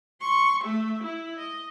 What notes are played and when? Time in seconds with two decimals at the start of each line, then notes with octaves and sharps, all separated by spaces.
0.21 C6 C#6
0.63 A3 E5
1.03 E4
1.38 D#5